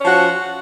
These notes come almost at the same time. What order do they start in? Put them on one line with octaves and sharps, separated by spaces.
C#4 F3 F#4